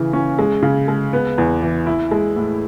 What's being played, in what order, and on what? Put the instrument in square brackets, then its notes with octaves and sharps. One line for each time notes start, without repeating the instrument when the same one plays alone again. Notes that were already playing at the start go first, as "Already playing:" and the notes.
Already playing: [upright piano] C#3 E3
C#4
G#3
C#3
G#3
B3
E2
E3
E4
G#3
A2